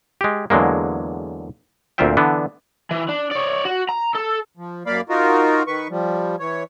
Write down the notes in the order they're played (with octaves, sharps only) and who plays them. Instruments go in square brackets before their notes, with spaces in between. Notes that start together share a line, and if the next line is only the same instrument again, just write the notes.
[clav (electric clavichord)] G#3 G4
E2 D3 F#3 G#3 A#3
D2 A#2 C4 F4 E5 G5
D3 E3 B3 D4
[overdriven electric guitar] E3
D4
C#5 D5
F#4
A#5
A4
[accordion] F3
F#2 A#3 D5 F5 B5
D#4 F4 F#4 A#4
D#3 B4 C#6
F3 G3
E3 C#5